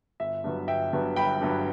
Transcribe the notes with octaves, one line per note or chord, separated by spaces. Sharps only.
G1 E5
G2 F#3 B3
G1 E5 G5
G2 F#3 B3
G1 G5 B5
G2 F#3 B3